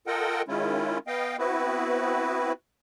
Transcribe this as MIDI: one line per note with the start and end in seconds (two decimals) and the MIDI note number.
0.07 0.42 65
0.07 0.42 69
0.07 0.42 70
0.07 0.42 75
0.07 0.42 78
0.07 0.42 79
0.48 0.98 51
0.48 0.98 56
0.48 0.98 61
0.48 0.98 64
0.48 0.98 65
1.07 1.37 59
1.07 1.37 75
1.07 1.37 77
1.07 1.37 79
1.38 2.52 59
1.38 2.52 60
1.38 2.52 64
1.38 2.52 66
1.38 2.52 71